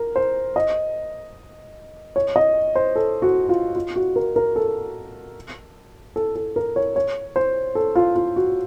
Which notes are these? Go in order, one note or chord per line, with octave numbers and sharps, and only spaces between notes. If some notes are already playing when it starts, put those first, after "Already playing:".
Already playing: A#4
C5
D#5
C#5
D#5
C5
A4
F#4
F4
F4
F#4
A#4
A#4
A4
A4
A4
A#4
C#5
C#5
C5
A4
F4
F4
F#4